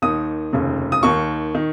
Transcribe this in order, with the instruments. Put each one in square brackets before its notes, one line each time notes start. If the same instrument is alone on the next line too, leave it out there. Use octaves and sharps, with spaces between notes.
[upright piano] D#2 D#3 D#6
F1 D#2 C#3
D#6
D#2 D#3 C#6
D#3